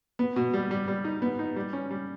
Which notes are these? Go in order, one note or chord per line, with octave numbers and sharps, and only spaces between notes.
B3
B2
G3
G3
G3
D#4
B3
D#4
G3
C#4
G3